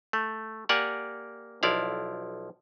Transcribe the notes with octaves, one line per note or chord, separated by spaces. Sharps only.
A3
A#3 G4 D5 F#5 G#5 A#5
B1 F3 E4 D5 F5